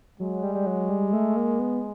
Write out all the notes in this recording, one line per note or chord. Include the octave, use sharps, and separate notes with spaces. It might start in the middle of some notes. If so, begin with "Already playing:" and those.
F#3 G#3
G3
G3
F#3
G3
A3
A#3
B3